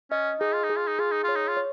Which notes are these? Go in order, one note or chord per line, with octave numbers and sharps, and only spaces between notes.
C#4 D#5
D#4 G#4
F4
D#4
G#4
F4
D#4
F4 G#4
D#4
F4 C#5
D#4
F4
C#5